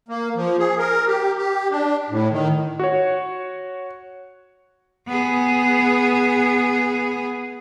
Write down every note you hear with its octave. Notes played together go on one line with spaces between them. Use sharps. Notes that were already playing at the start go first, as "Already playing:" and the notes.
A#3
F3
G#4
A#4
G4
G4
D4
A2
D#3
F#4 C#5
B3 G#4